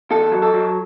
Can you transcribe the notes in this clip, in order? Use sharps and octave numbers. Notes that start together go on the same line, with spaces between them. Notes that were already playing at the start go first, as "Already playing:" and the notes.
E2 A4
F#3
A4
F#3